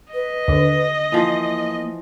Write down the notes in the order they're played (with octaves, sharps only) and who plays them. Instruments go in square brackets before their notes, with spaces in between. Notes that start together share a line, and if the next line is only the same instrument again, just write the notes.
[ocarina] B4 [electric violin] D#5
[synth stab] D#2 D3
[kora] E3 F3 [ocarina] A#3